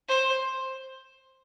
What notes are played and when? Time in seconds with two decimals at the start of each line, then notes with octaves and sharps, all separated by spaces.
0.08 C5